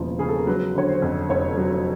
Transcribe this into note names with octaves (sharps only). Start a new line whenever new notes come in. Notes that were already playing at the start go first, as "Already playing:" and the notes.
Already playing: E1 D#2 C#3 F3
C#3 G#4
A4
A#4
F#3 B4
D3 C#5
C5
F2
F1 C#5
F#3